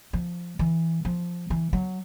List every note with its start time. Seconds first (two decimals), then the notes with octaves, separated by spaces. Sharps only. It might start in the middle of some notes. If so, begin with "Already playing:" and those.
0.13 F3
0.59 E3
1.05 F3
1.50 E3
1.73 F#3